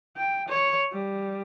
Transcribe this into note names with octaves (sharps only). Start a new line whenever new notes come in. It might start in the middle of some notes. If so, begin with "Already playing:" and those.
G5
C#5
G3